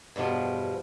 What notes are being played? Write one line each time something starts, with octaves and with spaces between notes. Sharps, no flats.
E2 G2 B2 F3